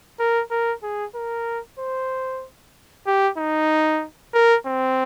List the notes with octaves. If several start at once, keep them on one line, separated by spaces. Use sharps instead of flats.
A#4
A#4
G#4
A#4
C5
G4
D#4
A#4
C4